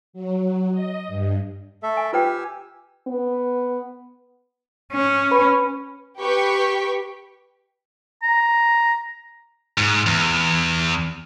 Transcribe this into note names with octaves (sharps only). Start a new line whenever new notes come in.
F#3
D#5
G2
A3 A4 E5
G#5
F4 G4 B4 G5 G#5 E6
B3
C#4
B4 B5
G4 B4 G5 C#6 B6
A#5
G#2
E2